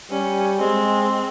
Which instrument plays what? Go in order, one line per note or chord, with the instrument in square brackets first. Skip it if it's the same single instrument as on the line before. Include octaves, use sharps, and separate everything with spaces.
[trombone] G3 [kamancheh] C#4
[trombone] G#3 [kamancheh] C4